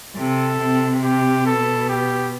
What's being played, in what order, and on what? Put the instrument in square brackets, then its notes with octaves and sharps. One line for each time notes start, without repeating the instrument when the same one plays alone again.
[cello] C3 [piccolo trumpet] A4
[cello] C3
[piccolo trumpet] G4
[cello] B2 [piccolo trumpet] A4
[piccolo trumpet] G4